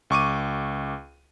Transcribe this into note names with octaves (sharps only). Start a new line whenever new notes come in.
C#2 C#6 D6 D#7